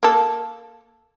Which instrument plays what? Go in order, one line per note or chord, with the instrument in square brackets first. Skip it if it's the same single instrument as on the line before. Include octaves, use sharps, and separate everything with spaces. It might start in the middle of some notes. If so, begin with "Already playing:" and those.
[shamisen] A#3 A4